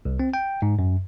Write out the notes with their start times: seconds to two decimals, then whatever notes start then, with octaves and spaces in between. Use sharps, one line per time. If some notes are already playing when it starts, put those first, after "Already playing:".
0.05 C2
0.20 C4
0.34 G5
0.62 G#2
0.79 F#2